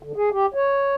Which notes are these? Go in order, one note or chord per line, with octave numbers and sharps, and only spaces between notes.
D3
G#4
G4
C#5